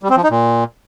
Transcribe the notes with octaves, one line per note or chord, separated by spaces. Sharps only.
G3
C4
F3
D#4
A#2